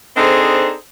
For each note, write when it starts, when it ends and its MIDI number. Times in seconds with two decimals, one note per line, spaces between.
0.17 0.72 60
0.17 0.72 62
0.17 0.72 63
0.17 0.72 68
0.17 0.72 69
0.17 0.72 72